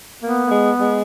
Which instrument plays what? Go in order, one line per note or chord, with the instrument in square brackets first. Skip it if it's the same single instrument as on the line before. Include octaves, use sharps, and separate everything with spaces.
[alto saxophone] A#3 [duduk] B3
[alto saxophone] A#3
G#3
G#3